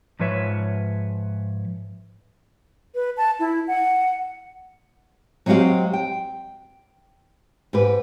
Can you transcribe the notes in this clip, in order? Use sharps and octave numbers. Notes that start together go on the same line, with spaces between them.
G#2 F3 B4 C#5 E5
B4
A5
E4
F#5
F#3 G#3 C4 F#4 G4 F5
G5
G#2 G4 B4